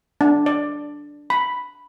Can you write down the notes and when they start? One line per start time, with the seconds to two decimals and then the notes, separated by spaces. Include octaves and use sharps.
0.21 D4
0.46 D5
1.30 B5